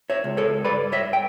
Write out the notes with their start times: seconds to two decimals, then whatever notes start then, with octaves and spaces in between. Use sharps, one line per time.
0.10 C#5 E5
0.24 C#2
0.37 A4 C#5
0.64 G2 B4 D5
0.92 C#5 E5
1.13 G5